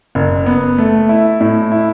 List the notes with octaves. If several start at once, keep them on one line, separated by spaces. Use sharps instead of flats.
F#1
B3
A3
E4
A2
E4